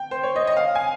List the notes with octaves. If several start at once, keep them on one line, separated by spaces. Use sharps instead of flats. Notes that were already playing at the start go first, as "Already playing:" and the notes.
Already playing: G5
C5
C#5
D#5
D#5
F5
G#5